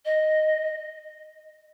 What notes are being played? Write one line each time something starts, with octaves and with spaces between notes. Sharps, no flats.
D#5